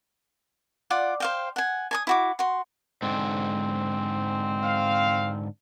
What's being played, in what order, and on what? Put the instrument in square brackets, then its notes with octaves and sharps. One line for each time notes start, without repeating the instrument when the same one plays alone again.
[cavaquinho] F4 D5 F#5
C5 F5 G5
F#5 G#5
G#5 A5 D#6
E4 F#4 D6
F#4 C6
[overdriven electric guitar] G#2 D3 [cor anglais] C4
[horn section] F5